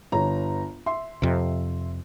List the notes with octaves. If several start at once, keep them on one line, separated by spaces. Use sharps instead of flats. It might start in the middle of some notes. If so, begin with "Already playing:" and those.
G1 C#5 A#5
E5 C6
F2 C3